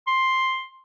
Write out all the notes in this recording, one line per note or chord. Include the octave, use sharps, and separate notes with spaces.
C6